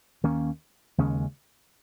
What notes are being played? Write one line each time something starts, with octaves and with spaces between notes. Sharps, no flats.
D#2 D#3 A#3 C#4
D#2 C#3 G#3 C#4